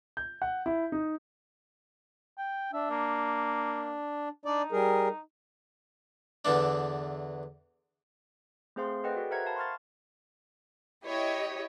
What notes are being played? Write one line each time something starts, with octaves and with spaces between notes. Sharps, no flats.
G6
F#5
E4
D#4
G5
D4 E5
A#3
D4 D#4 D5
G3 G#4 A#4
E2 D3 E3 D4
A3 C4 G#4 C5 F5 C6
G#4 A4 B4 D#5 F#5 G5
F#4 A4 B4 D5
A#4 C5 E5 F#5 A#5 G#6
E5 F5 A5 B5
C6 C#6 F6 A6
E4 G4 C#5 D#5